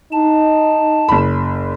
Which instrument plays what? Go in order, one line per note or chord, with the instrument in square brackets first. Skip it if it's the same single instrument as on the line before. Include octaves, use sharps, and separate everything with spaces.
[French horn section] D#4 [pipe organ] A5
[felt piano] F#1 B5